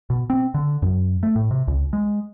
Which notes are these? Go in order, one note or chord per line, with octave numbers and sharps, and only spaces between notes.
B2
C4
D3
F#2
A3
A2
C3
C#2
G#3